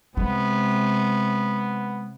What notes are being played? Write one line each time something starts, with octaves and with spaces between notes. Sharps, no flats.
C3 G#3 B3